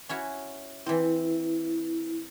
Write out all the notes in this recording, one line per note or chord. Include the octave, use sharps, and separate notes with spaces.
C#4 E4 F#4
E3 C4 E4